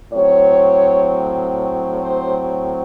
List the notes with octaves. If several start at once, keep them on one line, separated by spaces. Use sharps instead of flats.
A2 F#3 C4 C#5
C5